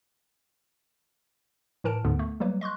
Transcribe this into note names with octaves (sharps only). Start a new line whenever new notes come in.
A2 E3 A#4 A5 D7
D2 G#2 D3 B3
A3
F#3 G3 A#3 B4
D#5 C6 C#6 F#6